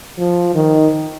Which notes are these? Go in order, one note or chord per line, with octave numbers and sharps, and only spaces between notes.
F3
D#3